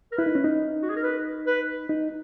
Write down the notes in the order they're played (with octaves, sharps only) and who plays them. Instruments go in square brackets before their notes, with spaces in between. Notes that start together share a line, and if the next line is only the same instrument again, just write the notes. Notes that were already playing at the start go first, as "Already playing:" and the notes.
[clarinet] A#4
[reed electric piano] E4 [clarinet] B4
[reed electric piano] D#4
C#4
D#4
[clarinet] F#4
G#4
A#4
B4
B4
[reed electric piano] D#4